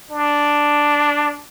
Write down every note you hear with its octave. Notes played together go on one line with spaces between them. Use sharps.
D4